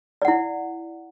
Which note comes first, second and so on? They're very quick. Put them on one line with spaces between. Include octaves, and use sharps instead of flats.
D5 F#5 E4